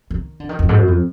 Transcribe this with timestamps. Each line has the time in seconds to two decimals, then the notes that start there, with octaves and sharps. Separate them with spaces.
0.11 D#3
0.40 D3
0.49 D#3
0.59 F2
0.69 G#2
0.78 F#2
0.88 F2